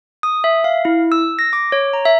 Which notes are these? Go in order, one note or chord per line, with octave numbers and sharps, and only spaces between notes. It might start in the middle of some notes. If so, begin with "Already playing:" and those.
D#6
E5
F5
E4
E6
A#6
D6
C#5
A#5
E5